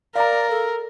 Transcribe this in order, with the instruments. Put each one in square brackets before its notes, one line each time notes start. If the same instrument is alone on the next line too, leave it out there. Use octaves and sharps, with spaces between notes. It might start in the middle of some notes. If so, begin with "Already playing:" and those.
[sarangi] A#4 [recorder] D5 [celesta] F5 A#5
[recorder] A4